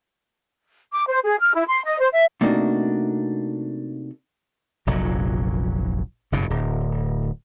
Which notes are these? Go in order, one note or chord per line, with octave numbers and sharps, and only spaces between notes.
D6
C5
G#4
F6
E4
C6
D#5
C5
E5
C3 A3 A#3 D4 D#4 F#4
F1 A#1 A#2 F#3
F#1 G2 B2
D1